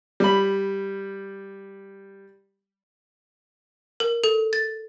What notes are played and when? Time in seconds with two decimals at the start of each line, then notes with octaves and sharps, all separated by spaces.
0.20 G3 B5
4.00 A#4
4.24 A4
4.53 A6